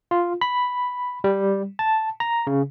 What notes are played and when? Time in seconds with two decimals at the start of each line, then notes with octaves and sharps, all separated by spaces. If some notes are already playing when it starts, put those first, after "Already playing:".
0.11 F4
0.41 B5
1.24 G3
1.79 A5
2.20 A#5
2.47 C#3